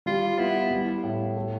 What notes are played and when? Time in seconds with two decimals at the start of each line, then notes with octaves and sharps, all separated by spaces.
0.06 G3 F4
0.38 B3 E4
0.71 G3
1.03 A2
1.36 A3